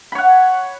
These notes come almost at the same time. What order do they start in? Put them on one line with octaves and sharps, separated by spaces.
B5 C#5 F#5